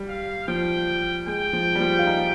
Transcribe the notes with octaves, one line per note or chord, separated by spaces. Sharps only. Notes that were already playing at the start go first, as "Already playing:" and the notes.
Already playing: G3
F5
F3 G5
G#3 G5
F3
G3
F3
F4
D#4